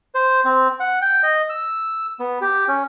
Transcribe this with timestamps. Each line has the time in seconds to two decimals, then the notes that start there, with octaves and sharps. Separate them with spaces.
0.15 C5
0.45 C4
0.80 F#5
1.02 G5
1.23 D#5
1.49 E6
2.20 B3
2.41 G4
2.68 C#4